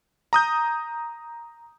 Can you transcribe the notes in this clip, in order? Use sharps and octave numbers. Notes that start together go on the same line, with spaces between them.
A#5 D#6 G6